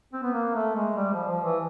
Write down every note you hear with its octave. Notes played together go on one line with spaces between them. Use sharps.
C4
B3
A#3
A3
G#3
G3
F3
F3
E3